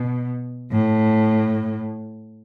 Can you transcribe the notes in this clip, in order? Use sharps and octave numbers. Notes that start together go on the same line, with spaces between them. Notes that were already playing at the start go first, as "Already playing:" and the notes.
Already playing: B2
A2